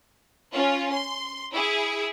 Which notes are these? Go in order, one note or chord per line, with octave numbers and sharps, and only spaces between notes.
C#4 F4
C6
E4 G#4